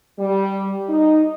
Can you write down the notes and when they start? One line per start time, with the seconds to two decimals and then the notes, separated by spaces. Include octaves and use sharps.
0.19 G3
0.88 D#4